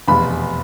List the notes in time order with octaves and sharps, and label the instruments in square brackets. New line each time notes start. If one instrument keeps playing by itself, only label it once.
[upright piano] F1 E2 B2 B5